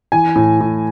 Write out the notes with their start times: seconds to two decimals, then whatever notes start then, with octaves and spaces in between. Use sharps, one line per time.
0.12 E3 G#5
0.36 A2
0.61 A2